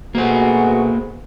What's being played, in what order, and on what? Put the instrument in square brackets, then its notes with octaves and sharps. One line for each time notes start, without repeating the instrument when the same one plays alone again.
[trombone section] B2 A3 G#4 [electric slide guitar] A#3 C5 [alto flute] F#4